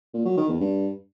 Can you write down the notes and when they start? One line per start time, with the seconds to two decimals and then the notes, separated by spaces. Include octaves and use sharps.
0.14 A#2
0.25 F#3
0.37 D#3
0.49 E2
0.60 G2